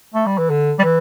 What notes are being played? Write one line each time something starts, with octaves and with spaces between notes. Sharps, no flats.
A3
G3
E3
D3
G3
E3